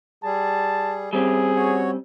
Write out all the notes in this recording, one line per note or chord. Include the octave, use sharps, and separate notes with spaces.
G3 G#4 A5
G3 C4 C#4 G#4
F#4 C#5